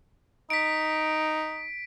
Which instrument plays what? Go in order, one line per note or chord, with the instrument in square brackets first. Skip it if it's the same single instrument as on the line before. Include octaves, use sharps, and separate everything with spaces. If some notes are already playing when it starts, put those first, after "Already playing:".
[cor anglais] D#4 [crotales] B6 D7